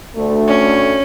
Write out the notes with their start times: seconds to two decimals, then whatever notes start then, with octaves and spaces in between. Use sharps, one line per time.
0.16 D2 A3
0.48 C#4